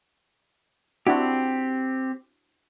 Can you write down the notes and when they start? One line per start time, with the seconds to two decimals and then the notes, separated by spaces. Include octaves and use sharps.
1.07 C4 D4 E4 F#4 G4